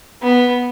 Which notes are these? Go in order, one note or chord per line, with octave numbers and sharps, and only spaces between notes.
B3